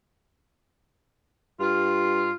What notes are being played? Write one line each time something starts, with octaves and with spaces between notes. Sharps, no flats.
G2 F4